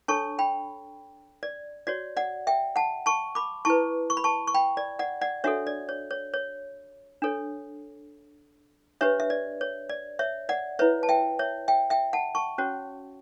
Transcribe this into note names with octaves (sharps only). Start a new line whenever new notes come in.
D4 A4 C#5 A5 C#6
G5 B5
D5
F#4 C#5 D5
D5 F#5
E5 G5
F#5 A5
A5 C#6
B5 D6
E4 B4 A5 C#6
C#6
B5
A5 C#6
C#6
G5 B5
D5
D5 F#5
D5 F#5
D4 F#4 A4 C#5 E5
D5
C#5
C#5
C#5
D4 A4 C#5
D4 G4 B4 C#5 E5
E5
D5
C#5
D5
C#5 E5
D5 F#5
E4 B4 C#5 E5
A5
E5 G5
C#5 E5
E5 G5
E5 G5
F#5 A5
A5 C#6
C#4 F#4 C#5